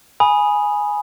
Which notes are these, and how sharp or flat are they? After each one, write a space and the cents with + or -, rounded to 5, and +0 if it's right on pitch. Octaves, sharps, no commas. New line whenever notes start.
G#5 +0 B5 -10 D#6 +0